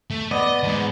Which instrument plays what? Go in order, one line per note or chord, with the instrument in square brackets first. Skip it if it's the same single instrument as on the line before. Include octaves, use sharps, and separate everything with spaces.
[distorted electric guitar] A3
[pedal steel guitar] B3 D5 [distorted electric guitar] D#5
[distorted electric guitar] E2 G#2